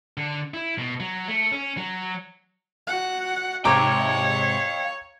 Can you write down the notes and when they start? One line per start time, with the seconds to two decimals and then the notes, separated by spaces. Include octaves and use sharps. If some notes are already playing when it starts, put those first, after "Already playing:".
0.17 D3
0.54 E4
0.78 B2
1.00 F#3
1.28 A3
1.52 C#4
1.77 F#3
2.87 F#4 F#5
3.65 G#2 C3 C#5 F5 G5 A#5 D6